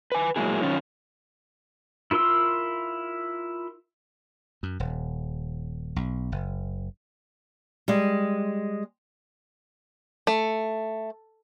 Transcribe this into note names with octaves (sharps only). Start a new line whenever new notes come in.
B4 G#5
A#2 F#3 G#3 A#3 E4 G#4
F#2 D#3 C#4 F4
E4 F4 A#4 C6 E6
F#2
D#1
B1
F#1
G3 G#3
A3